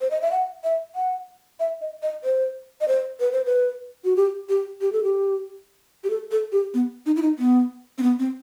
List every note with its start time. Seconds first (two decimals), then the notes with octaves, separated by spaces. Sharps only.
0.01 C5
0.11 D#5
0.22 E5
0.32 F#5
0.64 E5
0.96 F#5
1.60 E5
1.81 D#5
2.02 D#5
2.24 C5
2.81 D#5
2.88 C5
3.20 B4
3.32 C5
3.45 B4
4.05 F#4
4.16 G4
4.49 G4
4.81 G4
4.92 A4
5.04 G4
6.04 G4
6.10 A4
6.31 A4
6.52 G4
6.74 B3
7.06 D#4
7.16 E4
7.22 D#4
7.39 B3
7.98 C4
8.03 B3
8.19 C4